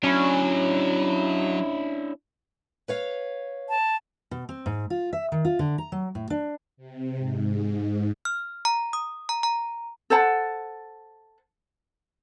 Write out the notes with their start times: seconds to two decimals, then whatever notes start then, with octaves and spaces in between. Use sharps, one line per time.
0.04 F#3 C#4 D4 E4
2.88 B4 C#5 F5
3.69 A5
4.31 B2
4.49 C4
4.66 G#2
4.90 F4
5.13 E5
5.32 D#3
5.45 F4
5.59 D3
5.78 A#5
5.92 F#3
6.15 A2
6.30 D4
6.77 C3
7.18 G#2
8.25 F6
8.65 A#5
8.93 D#6
9.29 A#5
9.43 A#5
10.10 A4 C5 F#5 A5